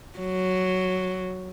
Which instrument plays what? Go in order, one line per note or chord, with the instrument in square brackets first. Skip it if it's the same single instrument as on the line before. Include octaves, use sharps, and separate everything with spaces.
[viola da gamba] F#3